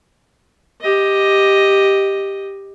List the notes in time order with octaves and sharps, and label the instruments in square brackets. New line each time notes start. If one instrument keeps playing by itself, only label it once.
[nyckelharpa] G4 D#5